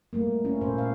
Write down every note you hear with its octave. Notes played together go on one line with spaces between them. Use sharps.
G3 A3 A#3
C#4 E4
A#2 A4 C5
F5